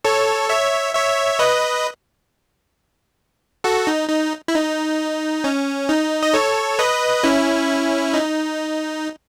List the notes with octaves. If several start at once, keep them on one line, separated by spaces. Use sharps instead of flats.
A4 C#5
C#5 E5
C#5 E5
B4 D#5
F#4 A4
D#4
D#4
E4
D#4
C#4
D#4
D#5
A4 C#5
B4 D#5
C#4 E4
D#4